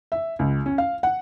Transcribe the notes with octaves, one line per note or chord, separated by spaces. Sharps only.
E5
C#2
C#4
F5
F#5